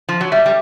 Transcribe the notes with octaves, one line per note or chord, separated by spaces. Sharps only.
F3
F#3
G3 E5
G3